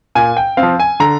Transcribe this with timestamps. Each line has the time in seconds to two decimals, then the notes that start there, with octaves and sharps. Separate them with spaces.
0.15 A#2 G#5
0.37 G5
0.57 C4 F5
0.63 F3
0.80 G#5
1.00 D3 A#5